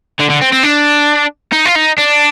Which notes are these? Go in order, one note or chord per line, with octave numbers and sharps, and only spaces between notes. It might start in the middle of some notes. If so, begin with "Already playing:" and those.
D3
D3
C4
C4
D4
D#4
F4
D#4
D4